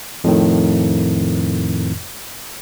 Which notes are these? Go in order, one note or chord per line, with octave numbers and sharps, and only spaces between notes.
F2 A2 D#3